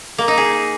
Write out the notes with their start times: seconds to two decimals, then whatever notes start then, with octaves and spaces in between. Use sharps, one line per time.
0.18 A#3
0.28 D#4
0.37 G#4